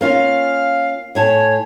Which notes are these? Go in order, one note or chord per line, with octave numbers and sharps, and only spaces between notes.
A#3 C#4 F4 F5
A2 C#5 G#5 A5